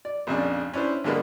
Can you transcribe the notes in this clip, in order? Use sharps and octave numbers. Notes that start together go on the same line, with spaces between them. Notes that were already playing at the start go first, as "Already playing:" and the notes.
D5
A#1 F2 C#3 D4
C#4 D4 E4 B4 C5
G2 D3 G#3 A#3 B3 D4